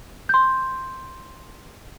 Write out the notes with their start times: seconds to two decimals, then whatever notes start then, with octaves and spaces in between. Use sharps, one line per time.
0.29 C6 G6